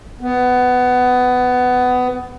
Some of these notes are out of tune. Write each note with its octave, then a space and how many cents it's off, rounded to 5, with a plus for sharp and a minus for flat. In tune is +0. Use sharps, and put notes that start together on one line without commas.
B3 +15